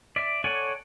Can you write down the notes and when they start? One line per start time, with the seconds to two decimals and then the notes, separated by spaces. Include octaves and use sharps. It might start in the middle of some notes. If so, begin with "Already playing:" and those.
0.16 D5 E5
0.44 A4 C#5 D5 F#5 G#5